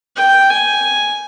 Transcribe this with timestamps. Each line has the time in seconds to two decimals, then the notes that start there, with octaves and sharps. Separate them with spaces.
0.16 G5
0.50 G#5